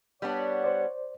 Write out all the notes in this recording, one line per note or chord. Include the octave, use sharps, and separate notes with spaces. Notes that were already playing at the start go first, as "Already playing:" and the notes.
G3 B3 D4 C#5 F#5
C5 D5